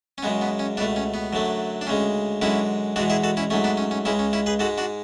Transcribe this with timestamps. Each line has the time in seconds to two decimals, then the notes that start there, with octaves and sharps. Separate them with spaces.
0.18 C#4
0.23 F#2 C#3 G#3 B3
0.41 B3
0.59 C#4
0.77 C#2 B2 A3 B3 D4
0.96 C#4
1.14 B3
1.33 F#2 D3 F#3 A3
1.81 D4
1.87 D2 C#3 G#3 C#4
2.42 F#2 D3 G#3 C#4 E4
2.96 E2 B2 G#3 D4 F#4
3.10 E4 G#4
3.24 F#4 A4
3.37 C#4 E4
3.50 G#2 F#3 A3 C#4
3.64 B3 D4
3.77 C#4
3.91 C#4
4.05 C#2 C#3 G#3 C#4 E4
4.19 C#4
4.33 C#4 E4
4.46 G#4 B4
4.59 G#2 G#3 F#4 A4
4.78 D4 F#4